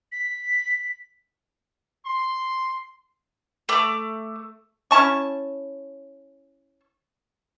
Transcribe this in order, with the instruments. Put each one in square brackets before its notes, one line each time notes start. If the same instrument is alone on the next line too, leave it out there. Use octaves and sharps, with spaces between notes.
[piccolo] B6
[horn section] C6
[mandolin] A3 D6
[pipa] C#4 E4 A5 C#6